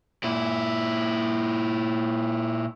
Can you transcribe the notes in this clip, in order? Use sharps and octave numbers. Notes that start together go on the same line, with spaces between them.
A#2 E4